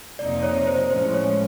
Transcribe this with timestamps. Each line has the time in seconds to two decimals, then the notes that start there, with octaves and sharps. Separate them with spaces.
0.19 F2 C3 F3 A#3 D#4 D5
0.43 C#5
0.67 C5
0.90 A2 F3 G#3 C#4 C5
1.14 C#5